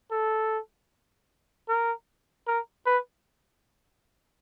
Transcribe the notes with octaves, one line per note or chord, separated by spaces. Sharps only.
A4
A#4
A#4
B4